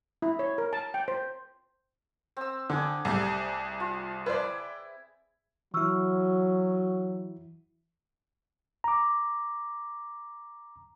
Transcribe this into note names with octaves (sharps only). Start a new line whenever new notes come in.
E4
C#5
A#4
A5
G5
C5
C4 E6
D3 D#5 G#5 D6
C2 G3 A3 G#4
F4
E4 B4 C5 D5
E3 F#3 E4 C#6 E6 F6
A#5 D6